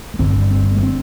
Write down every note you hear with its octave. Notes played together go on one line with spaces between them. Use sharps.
A3
G1 G2 D3 C4
C4
A3
D3 C4